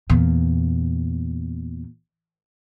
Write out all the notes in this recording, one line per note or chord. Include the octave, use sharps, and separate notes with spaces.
E2 A#2